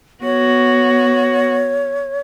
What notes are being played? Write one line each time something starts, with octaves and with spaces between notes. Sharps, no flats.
B3 F#4 C#5